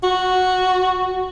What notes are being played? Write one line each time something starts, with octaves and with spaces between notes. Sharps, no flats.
F#4